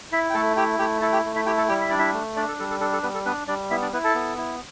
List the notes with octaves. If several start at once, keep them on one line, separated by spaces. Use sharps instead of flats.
E4 E5
G5
A3 A4 A5
E4 G4 G5
A3 G4 G5
E4 A4 A5
G4 G5
A3
E4 E5
E4 G4 G5
A4 A5
G3 G4 G5
E5
D4 D5
E4 E5
A3
D4 D5
A4
G3 A4
A4
D4 A4
A4
G3 B3 B4
A4
B3 D4 B4
G3 D4 D5
B3 E4 E5
D4 D5
B3 E4 B4
A4 A5
B3
E4